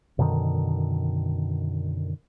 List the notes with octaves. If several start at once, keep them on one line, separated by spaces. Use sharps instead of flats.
F#2 B2 D3 D#3